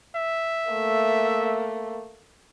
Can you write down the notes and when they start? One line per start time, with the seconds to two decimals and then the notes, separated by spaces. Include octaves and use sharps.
0.16 E5
0.70 A3 A#3